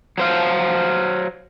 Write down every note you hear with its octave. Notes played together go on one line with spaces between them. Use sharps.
F#3 C5 F5